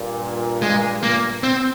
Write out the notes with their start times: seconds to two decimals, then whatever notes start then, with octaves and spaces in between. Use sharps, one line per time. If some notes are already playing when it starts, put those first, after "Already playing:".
Already playing: G2 A#2
0.62 G#3
1.03 A#3
1.43 C4